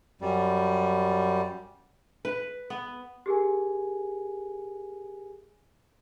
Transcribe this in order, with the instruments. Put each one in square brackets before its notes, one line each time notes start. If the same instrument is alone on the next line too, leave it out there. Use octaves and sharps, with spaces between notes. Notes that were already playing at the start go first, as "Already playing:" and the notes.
[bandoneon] F#2 G3
[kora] B4
B3
[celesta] G4 G#4 A#4 G#5